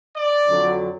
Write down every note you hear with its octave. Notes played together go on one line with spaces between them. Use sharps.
D5
F2 D3 F#3